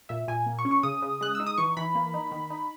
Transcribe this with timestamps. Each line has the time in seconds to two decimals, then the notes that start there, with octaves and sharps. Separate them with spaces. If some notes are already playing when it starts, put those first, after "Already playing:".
0.09 A#2 E5
0.28 A#2 G#5
0.46 A#3
0.59 C#6
0.65 C#4
0.71 C#6
0.83 C#3 D#6
1.02 C#3
1.21 G#3 F#6
1.35 D#4 E6
1.46 D#6
1.58 E3 C#6
1.77 E3 B5
1.95 A#3
2.14 D#4
2.32 D#3
2.50 D#4